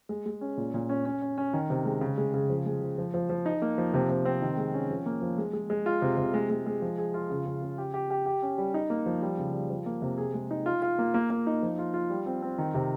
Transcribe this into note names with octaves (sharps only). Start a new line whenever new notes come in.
G#3
G#3
C#4
A#2
A#2
C#4
C#4
C#4
C#4
D#3
C3
G#3
C#3
G#3
C#3
F3
G#3
F3
F3
F3
F3
D#4
A#3
F3
C3
C3
C4
D#3
G#3
C#4
F3
A#3
F3
G#3
G#3
G#3
F4
C3
C3
G#3
G#3
G#3
F3
G#4
F4
C#3
C#3
C#3
G4
G4
G4
G4
C#4
G3
D#4
A#3
F3
G3
C#3
G3
F3
A#3
C3
G#4
G#3
D#4
F4
F4
A#3
A#3
A#3
D#4
F3
F4
F4
G3
C4
C4
D#3
C3